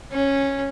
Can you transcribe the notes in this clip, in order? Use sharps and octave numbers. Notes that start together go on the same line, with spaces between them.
C#4